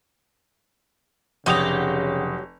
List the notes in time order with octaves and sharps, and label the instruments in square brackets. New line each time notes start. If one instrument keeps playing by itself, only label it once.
[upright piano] F1 D#6 F7 [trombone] C#3 [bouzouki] F#3 G4